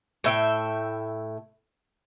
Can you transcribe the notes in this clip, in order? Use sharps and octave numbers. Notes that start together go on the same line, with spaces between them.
A2 E5 G5